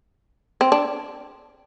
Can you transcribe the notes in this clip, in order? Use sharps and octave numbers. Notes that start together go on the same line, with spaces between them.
C4
D4